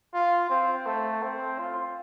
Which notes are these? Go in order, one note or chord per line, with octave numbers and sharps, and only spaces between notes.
F4
C4
A3
C4
F4